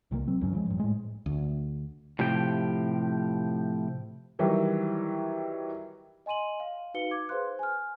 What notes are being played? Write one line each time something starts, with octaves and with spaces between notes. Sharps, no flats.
C2 C3 E3 A#3
F#3 C4
C#2 G2 F#3 C#4
F3 F#3 G#3
A1 G2
A2 G#3
D2
A2 C3 F3 G4 G5
D#3 E3 F#3 G3
D#5 G#5 C6 D#7 F#7
F5
D#4 F#4 B4 F5 C#7 G7
D6 G#6
G#4 B4 C5 F5 C6 F#6
G#5 F6